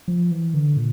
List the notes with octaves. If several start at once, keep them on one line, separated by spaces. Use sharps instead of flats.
F3
E3
D3
A#2